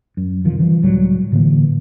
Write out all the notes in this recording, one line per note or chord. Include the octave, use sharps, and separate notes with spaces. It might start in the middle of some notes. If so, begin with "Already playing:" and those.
F#2
G1 C2 D#3 F3
E3 F3 G3
C#2 A2 F#3 G3
A2 D3 E3 A#3